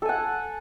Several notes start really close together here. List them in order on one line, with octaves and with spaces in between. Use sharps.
A4 G#5 F#5